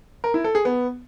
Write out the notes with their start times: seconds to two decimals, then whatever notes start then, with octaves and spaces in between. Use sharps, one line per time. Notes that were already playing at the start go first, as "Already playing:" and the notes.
0.24 A#4
0.34 E4
0.44 A4
0.55 G#4
0.65 B3